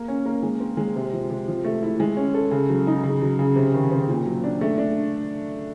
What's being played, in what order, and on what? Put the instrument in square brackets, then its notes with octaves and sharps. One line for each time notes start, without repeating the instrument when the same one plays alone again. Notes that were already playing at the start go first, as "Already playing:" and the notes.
Already playing: [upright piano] A#3
C#4
A#3
G#3
C4
G#3
C3
F3
C3
F3
A3
E4
G#3
C#4
A4
C#3
F#3
D#4
C#3
F#3
C#3
C3
D#3
C4
A#2
F#3
D4
A3
D4